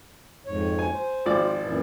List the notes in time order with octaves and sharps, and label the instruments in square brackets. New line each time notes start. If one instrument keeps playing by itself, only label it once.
[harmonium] F2 G#2 C#5
[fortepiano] G#5
[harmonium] C5
[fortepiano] G#1 F3 D5
[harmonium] F#2 A#2 E3